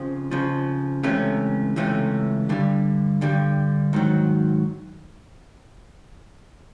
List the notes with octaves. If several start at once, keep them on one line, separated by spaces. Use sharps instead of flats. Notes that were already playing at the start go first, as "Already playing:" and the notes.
Already playing: F2 C#3 F3
F2 C#3 F3
C#2 C3 E3 A3 C#4
C#2 C3 E3 A3 C#4
G2 D3 G3
G2 D3 G3
G#2 D#3 F#3